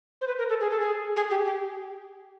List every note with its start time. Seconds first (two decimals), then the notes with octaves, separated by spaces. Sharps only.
0.21 C5
0.28 B4
0.38 A#4
0.49 A4
0.60 G#4
0.70 A4
0.80 G#4
1.16 G#4
1.30 G4
1.45 G4